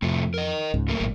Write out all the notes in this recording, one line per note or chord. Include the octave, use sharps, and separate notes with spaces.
F2 A2 C3 A3
A#4 D#5
C#2 G#2
F#2 A3 A#3
G#1 A#2